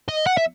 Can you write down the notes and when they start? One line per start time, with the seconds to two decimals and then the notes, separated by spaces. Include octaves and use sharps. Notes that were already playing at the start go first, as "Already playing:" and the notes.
0.09 D#5
0.27 F#5
0.37 E5